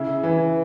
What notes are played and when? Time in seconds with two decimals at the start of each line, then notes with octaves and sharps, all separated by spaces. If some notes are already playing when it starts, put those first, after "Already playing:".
Already playing: C#3 E4
0.23 E3